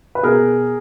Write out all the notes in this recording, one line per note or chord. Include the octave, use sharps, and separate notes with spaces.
B4
B2 G#4 A#4